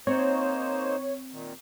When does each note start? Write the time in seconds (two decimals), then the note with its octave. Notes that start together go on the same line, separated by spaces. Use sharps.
0.07 A#3 C4 D#4 C5 C#5
1.32 A#2 D#3